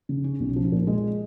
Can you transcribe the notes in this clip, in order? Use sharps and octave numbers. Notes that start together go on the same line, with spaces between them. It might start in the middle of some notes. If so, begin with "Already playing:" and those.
C#3
C#4
B1
F3
A#2
G#3